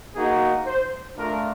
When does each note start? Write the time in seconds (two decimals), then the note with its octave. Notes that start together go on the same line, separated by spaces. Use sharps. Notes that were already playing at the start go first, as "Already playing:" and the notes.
0.15 A#3 D#4 F#4 G#4
0.67 C5
1.18 A3 D4 F4 A#4